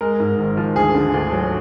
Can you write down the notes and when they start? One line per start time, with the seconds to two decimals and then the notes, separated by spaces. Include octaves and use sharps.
0.01 G#3 A#4
0.20 G#2
0.38 G#1
0.57 F3
0.76 D2 G#4
0.95 D3
1.14 D2
1.32 F#3